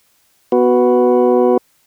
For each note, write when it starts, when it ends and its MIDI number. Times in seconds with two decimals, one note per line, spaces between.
0.52 1.58 59
0.52 1.58 66
0.52 1.58 71